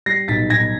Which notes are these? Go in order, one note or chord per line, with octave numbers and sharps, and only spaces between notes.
G3 A#6 C7
B1 A6 B6
B1 G#6 A#6